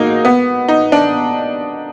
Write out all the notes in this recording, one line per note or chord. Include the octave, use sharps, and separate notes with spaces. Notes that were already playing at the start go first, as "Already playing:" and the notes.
Already playing: F#3 G#3 A#3 D#4
B3
D#4
D4